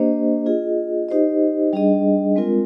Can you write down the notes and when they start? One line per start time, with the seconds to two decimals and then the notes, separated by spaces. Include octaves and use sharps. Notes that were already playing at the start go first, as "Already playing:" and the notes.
Already playing: A#3 D4 G4 C5 D#5
0.46 F4 G#4 D#5
1.09 D#4 G4 C5 D#5
1.73 G3 D4 G#4 D#5
2.36 G#3 C4 F4 A#4